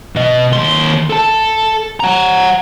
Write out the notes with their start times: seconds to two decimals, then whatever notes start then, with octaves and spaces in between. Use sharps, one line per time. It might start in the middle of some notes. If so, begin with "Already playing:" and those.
0.16 B2 D#5
0.52 D#2 C6
1.10 A4 A5
2.00 F#5 A#5